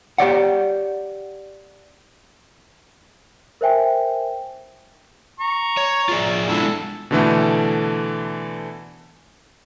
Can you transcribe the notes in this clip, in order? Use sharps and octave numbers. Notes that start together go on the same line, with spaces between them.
G4 C#5 D5 F#5
A#4 C5 E5 G5 G#5
A#5 C#6
C#5
F4 G#4 D5
G#3 D4 E4 A4
B2 D3 E3 A3